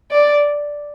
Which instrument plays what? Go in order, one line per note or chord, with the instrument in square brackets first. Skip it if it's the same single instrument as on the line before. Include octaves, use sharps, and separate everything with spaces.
[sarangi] D5